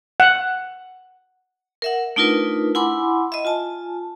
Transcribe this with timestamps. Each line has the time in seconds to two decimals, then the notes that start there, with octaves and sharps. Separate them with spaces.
0.20 F#5
1.82 A#4 E5 F#5
2.16 A3 D4 D#4 F4 A#4 B4
2.75 E4 F#5 G#5 B5 C6 D6
3.32 D#5 E5
3.45 F4 G#5 A5